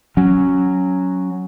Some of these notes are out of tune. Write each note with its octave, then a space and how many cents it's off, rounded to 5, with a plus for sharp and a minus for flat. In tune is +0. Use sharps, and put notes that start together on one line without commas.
F#3 +0 C#4 +0